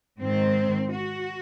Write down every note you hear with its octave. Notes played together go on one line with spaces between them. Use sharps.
G#2 D#3 C4
F#4